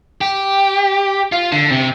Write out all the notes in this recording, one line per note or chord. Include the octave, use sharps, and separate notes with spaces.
G4
F4
D3
C3